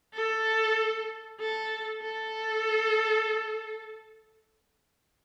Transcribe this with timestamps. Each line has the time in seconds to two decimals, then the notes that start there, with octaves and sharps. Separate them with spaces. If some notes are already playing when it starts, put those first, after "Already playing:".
0.14 A4
1.40 A4
2.02 A4